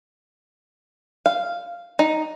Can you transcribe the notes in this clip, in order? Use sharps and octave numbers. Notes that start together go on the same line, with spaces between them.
F5
D#4